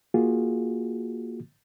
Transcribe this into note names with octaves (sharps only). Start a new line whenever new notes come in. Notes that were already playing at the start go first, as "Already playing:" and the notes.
A#3 F4 F#4 G#4